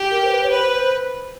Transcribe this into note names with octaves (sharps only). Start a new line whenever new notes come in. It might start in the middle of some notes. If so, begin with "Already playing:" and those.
Already playing: G4
A#4
C5
B4
C#5
B4 C5
C5